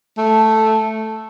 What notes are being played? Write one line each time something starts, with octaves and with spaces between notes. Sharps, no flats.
A3